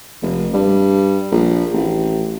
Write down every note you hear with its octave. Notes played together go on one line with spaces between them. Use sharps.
F1
G2
A#1
A1